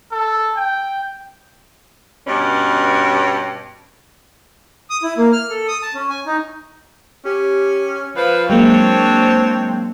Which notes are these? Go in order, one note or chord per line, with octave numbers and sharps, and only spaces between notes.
A4
G5
G2 B2 C#4
D#6
E4
A#3
F6
A4
D#6
A5
C#4
G#5
D#4
C#4 G4
F3 B4 F5
F#3 G#3 A#3 C4 D4 C5 C#5